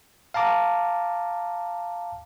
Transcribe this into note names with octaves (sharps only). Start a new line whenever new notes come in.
F5 A5 A#5 D6